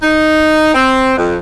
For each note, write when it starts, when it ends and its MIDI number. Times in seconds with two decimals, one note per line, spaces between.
0.03 0.72 63
0.75 1.14 60
1.17 1.37 41